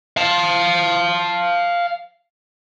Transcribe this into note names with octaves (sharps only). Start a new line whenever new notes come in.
F5 A5